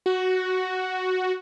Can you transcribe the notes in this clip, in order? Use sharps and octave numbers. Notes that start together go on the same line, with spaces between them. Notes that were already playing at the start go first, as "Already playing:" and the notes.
F#4